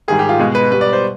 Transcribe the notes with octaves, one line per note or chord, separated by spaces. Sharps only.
G#2 D#3 G3 G#4
G4
F4
B2 G#3 G#4
B4
B2 G3 B4
D5
C5